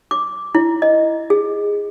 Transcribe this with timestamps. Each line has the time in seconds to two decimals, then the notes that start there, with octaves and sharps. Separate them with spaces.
0.11 D6
0.55 E4
0.82 D#5
1.30 G#4